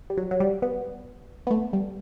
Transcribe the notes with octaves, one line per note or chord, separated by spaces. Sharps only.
G3
F#3
F#3
G3
B3
B3
A3
G3